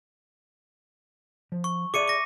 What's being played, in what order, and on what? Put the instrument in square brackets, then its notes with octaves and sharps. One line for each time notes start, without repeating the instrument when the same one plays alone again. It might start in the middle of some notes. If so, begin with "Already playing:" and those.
[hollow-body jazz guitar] F3
[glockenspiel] C#6
[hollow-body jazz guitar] G#4 D5 E5 [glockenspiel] D6 C#7 D#7
[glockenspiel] D6 A#6